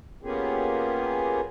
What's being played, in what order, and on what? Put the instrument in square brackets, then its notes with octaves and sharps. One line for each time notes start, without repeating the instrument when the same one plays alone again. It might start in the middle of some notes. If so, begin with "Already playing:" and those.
[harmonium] A#3 B3 C#4 F4 G4 G#4